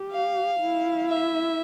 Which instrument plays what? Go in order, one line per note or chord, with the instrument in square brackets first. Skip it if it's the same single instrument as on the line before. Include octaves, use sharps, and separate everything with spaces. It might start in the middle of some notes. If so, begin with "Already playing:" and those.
Already playing: [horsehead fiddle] G4
[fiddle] F5
[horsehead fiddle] E4
[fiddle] E5